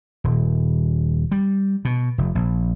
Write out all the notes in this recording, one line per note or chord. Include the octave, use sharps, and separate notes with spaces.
D#1
G3
B2
F1
A#1